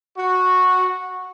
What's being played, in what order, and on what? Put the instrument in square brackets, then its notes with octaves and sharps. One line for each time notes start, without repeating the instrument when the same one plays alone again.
[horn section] F#4